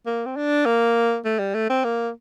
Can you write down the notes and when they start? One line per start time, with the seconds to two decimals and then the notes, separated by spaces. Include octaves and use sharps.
0.07 A#3
0.26 C4
0.36 D4
0.66 A#3
1.25 A3
1.39 G3
1.54 A3
1.70 C4
1.84 A#3